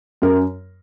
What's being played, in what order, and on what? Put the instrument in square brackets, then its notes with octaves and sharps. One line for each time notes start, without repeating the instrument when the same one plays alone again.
[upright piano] F#2 A#4